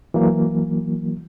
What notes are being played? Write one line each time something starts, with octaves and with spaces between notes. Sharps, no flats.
E3 F#3 A#3